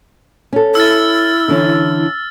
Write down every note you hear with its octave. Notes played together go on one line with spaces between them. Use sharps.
C#4 A4
E4 E6 F6 A6
D3 E3 C#4